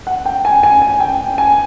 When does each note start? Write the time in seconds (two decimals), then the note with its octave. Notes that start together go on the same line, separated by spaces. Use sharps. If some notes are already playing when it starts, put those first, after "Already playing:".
0.07 F#5
0.26 G5
0.45 G#5
0.63 G#5
0.82 G#5
1.00 G5
1.38 G#5